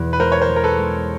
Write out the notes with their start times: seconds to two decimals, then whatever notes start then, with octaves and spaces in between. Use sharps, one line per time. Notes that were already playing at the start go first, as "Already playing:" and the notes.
Already playing: E2 B2
0.13 B4
0.20 G#3 A#4 C5
0.32 C#5
0.41 A#4 C5
0.49 G#3
0.56 A#4
0.64 A4 B4
0.78 G#3